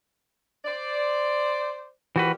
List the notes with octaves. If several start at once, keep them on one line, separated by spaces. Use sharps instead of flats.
C5 D5
A#2 E3 F3 F#4 G4 B4